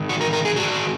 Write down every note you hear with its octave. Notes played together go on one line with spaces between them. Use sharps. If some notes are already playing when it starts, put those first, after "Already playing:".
Already playing: G#2 D#3
F#4
A#4
A#4
G#4
G#2 D#3 F#4